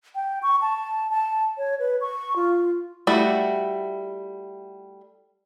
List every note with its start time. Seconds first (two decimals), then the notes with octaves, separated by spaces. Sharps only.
0.15 G5
0.43 C#6
0.61 A5
1.11 A5
1.58 C#5
1.79 B4
2.01 C#6
2.36 F4
3.07 G3 A3 E4 F#4